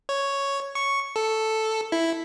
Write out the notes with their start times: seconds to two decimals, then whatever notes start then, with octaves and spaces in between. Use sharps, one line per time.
0.09 C#5
0.75 C#6
1.16 A4
1.92 E4